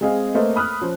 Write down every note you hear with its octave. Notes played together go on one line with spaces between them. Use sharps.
G#3 C4 G#4 D#5 F5
A3 A#3 B4 C5 D#5
B5 D#6 F6 F#6
F3 C#4 C5